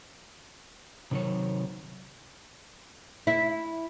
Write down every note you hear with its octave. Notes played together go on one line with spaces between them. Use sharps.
C3 D#3 F#3 C#5
E4